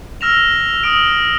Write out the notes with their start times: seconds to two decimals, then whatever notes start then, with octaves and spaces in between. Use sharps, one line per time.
0.21 E6 F6 A#6 E7 F7
0.84 D#6 E6 D7